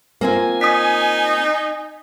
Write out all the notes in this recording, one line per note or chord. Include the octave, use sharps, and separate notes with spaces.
A#3 C4 F4 G#5
D#4 D#6 B6